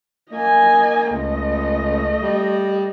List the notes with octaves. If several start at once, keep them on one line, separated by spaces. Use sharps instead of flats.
A#3 D#5 G#5
C#2 A3 D#5
G3